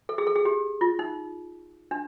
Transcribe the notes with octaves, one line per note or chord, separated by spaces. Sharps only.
A4
G#4
A4
G#4
G4
F4
D#4
D4